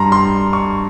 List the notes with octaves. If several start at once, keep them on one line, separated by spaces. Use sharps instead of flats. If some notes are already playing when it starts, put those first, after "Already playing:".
Already playing: G2 G3 A#5 C6
C6
C#6